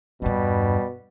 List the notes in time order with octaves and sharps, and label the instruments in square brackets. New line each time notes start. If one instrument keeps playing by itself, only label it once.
[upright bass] E2 G2 [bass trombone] B2 [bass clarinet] G3